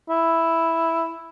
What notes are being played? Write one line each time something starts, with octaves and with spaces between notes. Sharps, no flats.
E4